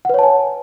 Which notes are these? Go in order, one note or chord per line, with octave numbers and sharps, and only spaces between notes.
B4 C#5 F#5 G#5 A5